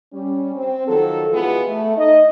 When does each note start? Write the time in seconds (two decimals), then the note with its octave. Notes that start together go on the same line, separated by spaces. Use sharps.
0.13 G3 C#4
0.56 C4
0.86 D#3 F3 F#3 A4
1.32 B2 E3 G#3 B3 F4 G#4
1.68 A3
1.97 D#4 D#5